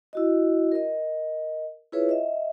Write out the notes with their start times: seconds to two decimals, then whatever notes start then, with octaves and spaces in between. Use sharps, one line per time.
0.13 E4 F#4 D#5
0.72 A#4 D#5
1.92 E4 F4 G#4 B4 C#5 E5
2.09 D#5 E5